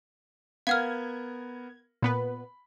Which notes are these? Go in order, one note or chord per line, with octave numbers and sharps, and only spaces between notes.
B3 A#4 F5 F#5 F6 G#6
A#2 B3 B4 B5